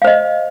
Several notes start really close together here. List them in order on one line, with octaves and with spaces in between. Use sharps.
F5 C5 D#5